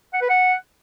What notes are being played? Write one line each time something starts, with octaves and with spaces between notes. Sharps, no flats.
F#5
B4
F#5